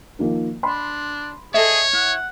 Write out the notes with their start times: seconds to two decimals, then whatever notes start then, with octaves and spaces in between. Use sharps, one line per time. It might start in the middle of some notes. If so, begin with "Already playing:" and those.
0.19 D#3 F3 A#3
0.63 D4 B5 C6
1.54 G#4 A4 C#5 D#5 E5
1.93 E4 F#5